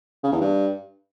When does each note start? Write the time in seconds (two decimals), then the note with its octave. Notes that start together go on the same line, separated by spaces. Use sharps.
0.24 C#3
0.32 E2
0.41 G2